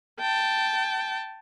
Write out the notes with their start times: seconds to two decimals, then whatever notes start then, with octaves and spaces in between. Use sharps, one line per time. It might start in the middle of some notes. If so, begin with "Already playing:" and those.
0.20 G5 A5